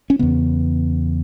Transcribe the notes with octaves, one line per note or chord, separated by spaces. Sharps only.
C#4
E2 C#3 B3